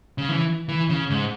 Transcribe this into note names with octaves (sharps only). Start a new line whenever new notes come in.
C#3
E3
E3
C#3
G#2